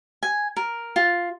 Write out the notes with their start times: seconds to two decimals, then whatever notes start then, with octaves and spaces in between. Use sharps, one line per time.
0.23 G#5
0.56 A#4
0.96 F4